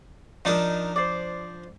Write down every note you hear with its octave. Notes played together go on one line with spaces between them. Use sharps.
F3 D4 D#4 A#4 D#6
C5 D5